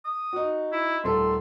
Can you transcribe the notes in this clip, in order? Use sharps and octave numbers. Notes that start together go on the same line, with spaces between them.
D#6
D#4 F#4
E4
D#1 A3 A4 C6